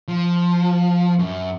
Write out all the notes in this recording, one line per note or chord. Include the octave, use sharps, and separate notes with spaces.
F3
F#2